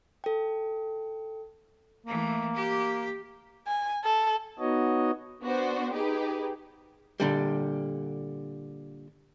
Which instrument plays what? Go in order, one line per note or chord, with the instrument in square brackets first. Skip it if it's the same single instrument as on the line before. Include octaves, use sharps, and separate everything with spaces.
[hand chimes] A4 G5
[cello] E3 A3 [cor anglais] A#3
[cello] G4
[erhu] G#5
A4
[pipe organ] B3 D#4 F#4 C#5 D#5
[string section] B3 D4 F#4 C5
D#4 G4 G#4 B4
[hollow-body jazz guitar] A#2 D3 G3